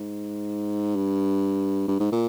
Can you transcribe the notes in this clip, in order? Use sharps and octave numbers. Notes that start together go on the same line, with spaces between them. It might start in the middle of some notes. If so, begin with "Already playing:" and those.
Already playing: G#2
G2
G2
G#2
A#2